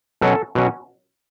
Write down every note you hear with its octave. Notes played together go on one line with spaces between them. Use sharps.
B2 F#3 C#4 A4
B2 F#3 C#4